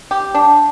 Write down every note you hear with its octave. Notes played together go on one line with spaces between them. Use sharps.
G4
D4